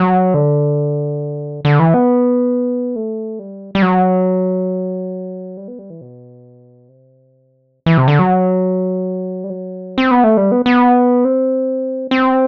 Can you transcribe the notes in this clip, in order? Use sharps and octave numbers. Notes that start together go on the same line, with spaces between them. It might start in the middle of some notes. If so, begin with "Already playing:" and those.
Already playing: F#3
D3
D3
E3
B3
A3
G3
G3
F#3
G3
B3
G3
E3
B2
C3
E3
C3
D3
F#3
G3
F#3
C4
B3
A3
G3
B3
B3
C4
C4